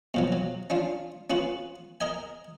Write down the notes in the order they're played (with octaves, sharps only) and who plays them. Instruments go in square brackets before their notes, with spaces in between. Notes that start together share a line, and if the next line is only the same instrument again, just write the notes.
[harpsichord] B2 F3 F#3
F#3
C#4 D4 F4
C#4 F4 F#4 B4
A#4 D#5 G#5